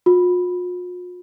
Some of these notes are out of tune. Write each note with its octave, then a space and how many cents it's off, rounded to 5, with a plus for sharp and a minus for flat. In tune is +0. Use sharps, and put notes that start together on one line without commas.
F4 +45